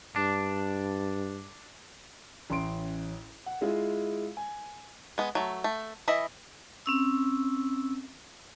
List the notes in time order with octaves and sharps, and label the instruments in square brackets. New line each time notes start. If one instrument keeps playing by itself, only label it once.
[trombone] G2 [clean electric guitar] D4
[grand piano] A1 C#4 C6 D7
F#5
G#3 E4 F4 G#4
G#5
[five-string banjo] G#3 B3
F#3 A3
A3
E3 D#5 E5 B5
[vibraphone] C4 C#4 E6